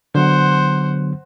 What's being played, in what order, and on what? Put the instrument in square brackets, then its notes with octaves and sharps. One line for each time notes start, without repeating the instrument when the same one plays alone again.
[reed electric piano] D3 F#3 B3 [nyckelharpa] C5 F#5